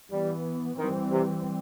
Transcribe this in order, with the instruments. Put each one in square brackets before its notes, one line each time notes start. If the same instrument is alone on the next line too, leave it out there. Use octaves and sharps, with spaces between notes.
[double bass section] E3 B3 [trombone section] G3
[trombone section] D#3 [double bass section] E3 G3 C4
[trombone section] C3